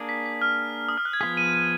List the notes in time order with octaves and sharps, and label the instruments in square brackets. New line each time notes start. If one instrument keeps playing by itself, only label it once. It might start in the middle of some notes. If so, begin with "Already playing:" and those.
Already playing: [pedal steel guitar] A#3 D4 G#4
[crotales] B6
B6
F6
D#6
F6
F#6
G#6
[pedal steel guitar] F3 B3 F4 G#4 [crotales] B6
[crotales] D#7
D#7